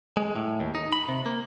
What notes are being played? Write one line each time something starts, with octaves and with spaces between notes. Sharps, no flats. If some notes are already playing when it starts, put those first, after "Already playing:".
G#3
A2
D#2
D#4
B5
C3
A#3